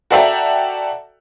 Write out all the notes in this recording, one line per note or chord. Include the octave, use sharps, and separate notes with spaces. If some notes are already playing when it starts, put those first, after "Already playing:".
F#4 A4 D5 E5 G5 A#5